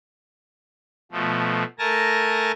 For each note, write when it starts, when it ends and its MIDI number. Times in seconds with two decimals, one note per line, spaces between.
1.12 1.64 47
1.12 1.64 53
1.12 1.64 57
1.79 2.52 57
1.79 2.52 70
1.79 2.52 80
1.79 2.52 81
1.79 2.52 94